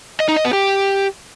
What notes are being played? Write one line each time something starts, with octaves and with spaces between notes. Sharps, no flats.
D#5
D#4
D#5
B3
G4